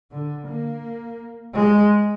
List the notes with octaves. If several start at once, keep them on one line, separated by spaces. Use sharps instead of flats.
D3
A#3
G#3